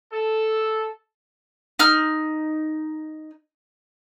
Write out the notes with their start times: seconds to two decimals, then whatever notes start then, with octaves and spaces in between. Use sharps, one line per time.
0.12 A4
1.79 D#4 F6